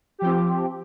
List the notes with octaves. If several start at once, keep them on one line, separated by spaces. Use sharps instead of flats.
F3 C4 G4